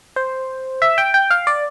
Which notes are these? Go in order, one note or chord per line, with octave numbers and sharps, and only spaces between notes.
C5
E5
G5
G5
F5
D5